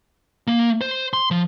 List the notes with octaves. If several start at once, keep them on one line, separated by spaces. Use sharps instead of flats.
A#3
C5
C6
F3